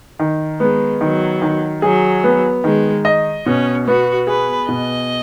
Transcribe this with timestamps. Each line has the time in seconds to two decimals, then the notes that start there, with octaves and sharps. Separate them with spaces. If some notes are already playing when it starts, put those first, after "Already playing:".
0.19 D#3
0.60 G#3 B3
1.01 D#3 F#3
1.42 D#3
1.82 F#3 G#4
2.24 B3
2.64 D#3 G#3
3.05 D#5
3.46 B2 C#4
3.86 B3 F#4
4.27 G#4 B4
4.68 B2 D#5